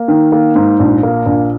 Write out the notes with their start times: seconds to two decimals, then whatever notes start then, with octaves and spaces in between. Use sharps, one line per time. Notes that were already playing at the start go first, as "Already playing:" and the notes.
Already playing: A#3
0.08 D#3
0.32 A#3
0.55 G#2
0.80 A#1
1.03 A#3
1.26 A#1